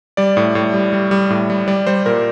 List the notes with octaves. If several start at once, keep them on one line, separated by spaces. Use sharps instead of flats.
G3 D5
A2
A2
G3
G3
G3
A2
G3
G3 D5
G3 C5
A#2 A#4